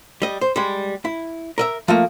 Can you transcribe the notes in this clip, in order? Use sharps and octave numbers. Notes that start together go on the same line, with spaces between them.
G3 D#5
C5
G3 G#3
E4
A#4 D#5 E5
F3 A3 A#3